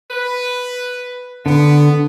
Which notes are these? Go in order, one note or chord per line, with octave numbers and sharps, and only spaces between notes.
B4
D3 B3